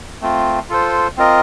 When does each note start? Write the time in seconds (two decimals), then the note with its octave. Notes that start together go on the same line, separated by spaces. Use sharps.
0.21 A3 C4 F4
0.69 F4 A4 C5
1.17 C4 F4 A#4 D#5